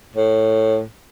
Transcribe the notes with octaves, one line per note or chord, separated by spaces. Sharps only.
A2